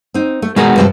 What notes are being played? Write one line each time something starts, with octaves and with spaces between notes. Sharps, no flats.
C4 D#4
A3
B2 G#3 D#4 F#4 G#4 A#4
G2 C3 F3